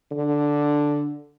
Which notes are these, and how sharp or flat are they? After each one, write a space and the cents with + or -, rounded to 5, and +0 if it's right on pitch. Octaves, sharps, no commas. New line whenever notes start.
D3 +0